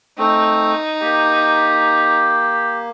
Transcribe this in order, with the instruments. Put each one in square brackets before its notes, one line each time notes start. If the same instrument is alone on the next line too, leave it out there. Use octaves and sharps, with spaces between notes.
[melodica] A3 C4 [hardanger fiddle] D#4
[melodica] A#3 [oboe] G4